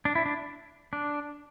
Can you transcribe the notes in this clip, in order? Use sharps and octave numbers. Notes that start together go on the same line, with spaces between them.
D4
E4
D4
D4